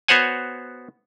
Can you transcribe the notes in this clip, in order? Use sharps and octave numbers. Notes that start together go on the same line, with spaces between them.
B3 F#4 C5 C#5 F#5 G#5